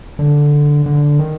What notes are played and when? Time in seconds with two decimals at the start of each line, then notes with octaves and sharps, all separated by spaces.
0.19 D3
0.86 D3
1.19 D#3